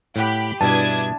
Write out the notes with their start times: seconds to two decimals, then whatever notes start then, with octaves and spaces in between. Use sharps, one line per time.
0.16 A2 G4 F#5 B5
0.61 G2 B2 D4 E4 A5 D#6 G#6